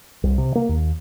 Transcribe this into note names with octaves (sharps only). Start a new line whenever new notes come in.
C2
C3
A#3
D#2